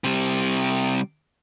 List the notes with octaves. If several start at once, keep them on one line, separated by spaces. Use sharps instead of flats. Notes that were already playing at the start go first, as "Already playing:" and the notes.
C3 G3